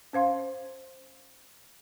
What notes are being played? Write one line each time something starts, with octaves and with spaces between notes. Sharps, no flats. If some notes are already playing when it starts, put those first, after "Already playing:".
C#4 C5 F5 C6